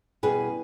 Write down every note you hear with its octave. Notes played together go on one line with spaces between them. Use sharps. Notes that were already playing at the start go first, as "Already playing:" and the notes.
E2 B2 G3 C#4 G#4 B4